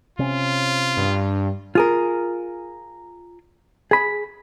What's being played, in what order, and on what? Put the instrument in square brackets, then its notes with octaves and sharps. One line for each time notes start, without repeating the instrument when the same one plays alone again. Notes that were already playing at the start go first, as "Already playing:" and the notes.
[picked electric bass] C3 C#4 [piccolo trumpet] F4
[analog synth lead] G2
[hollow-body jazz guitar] F4 G#4 A#4
G#4 B5